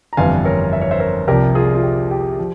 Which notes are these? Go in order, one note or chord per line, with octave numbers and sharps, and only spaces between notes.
A#5
G1 F2 E3 G3 F5 G#5
A#4 C#5
E5
C#5
C5 E5
A#4 C#5
C2 C3 F3 G4 A#4
F4 G#4
F4
G4
G4
F3